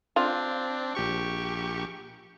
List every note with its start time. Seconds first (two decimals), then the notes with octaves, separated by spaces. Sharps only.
0.16 C4 D4 F4
0.95 A#1 G4 C#6